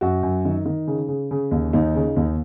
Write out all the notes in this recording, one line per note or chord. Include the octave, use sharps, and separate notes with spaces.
F#2 F#4
F#2
D#3
D#3
C#3
C#3
C#3
D#2
D#2 D#4
C#3
D#2